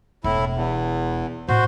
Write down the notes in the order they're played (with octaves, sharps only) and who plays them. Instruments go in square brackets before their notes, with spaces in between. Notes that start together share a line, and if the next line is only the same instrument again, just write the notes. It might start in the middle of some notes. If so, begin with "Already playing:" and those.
[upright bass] E1 [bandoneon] A2 E4
[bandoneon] E2
[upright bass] A2 C4 [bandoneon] F#4 C5